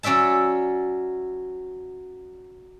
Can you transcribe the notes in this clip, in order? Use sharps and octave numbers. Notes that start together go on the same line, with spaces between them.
F#3 C#4 D5 E5 A5